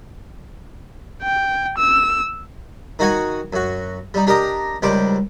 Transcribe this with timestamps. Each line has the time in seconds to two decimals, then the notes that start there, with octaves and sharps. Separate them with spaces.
1.22 G5
1.78 E6
2.99 D#3 D#4 F#4 F#5 G#5
3.53 F#2 F#4
4.14 G3 D#4
4.27 D4 G4 A#4 D#5 A#5
4.82 C#2 D#3 G3 C5 D6